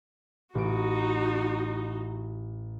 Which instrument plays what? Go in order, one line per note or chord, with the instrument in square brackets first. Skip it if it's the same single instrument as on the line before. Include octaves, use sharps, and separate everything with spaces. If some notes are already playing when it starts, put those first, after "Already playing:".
[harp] A1 D7 [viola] D#4 F#4